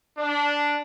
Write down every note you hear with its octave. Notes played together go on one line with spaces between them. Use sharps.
D4